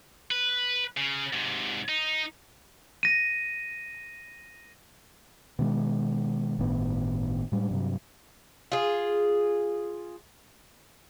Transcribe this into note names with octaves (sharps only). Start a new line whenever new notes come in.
B4
C#3
G#2 C3
D#4
A#6 D#7
B2 D#3 G#3
G1 A2 D#3 B3
A2 G3 G#3
G2 C3 F#3
F4 G#4